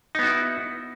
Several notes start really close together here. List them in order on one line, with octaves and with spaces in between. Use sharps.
D#4 B3 F#4 E4